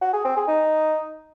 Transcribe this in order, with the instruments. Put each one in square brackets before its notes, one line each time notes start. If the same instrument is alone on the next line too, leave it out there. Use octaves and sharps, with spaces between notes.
[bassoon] F#4
G#4
C4
G#4
D#4